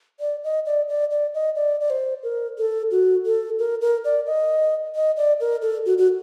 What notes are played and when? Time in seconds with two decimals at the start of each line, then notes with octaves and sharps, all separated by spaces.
0.20 D5
0.44 D#5
0.66 D5
0.89 D5
1.11 D5
1.34 D#5
1.56 D5
1.81 D5
1.90 C5
2.23 A#4
2.58 A4
2.91 F#4
3.26 A4
3.59 A#4
3.81 A#4
4.05 D5
4.27 D#5
4.95 D#5
5.17 D5
5.40 A#4
5.62 A4
5.86 F#4
5.98 F#4